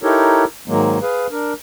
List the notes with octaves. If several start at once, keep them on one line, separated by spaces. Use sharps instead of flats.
D#4 E4 G4 A4 A#4 C#5
G#2 D#3 F#3 G#3 A#3
G#4 B4 F5
D4 A#4